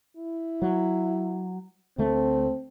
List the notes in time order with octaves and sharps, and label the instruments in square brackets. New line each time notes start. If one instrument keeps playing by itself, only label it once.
[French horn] E4
[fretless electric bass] F#3
[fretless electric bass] D2 A3 [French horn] C4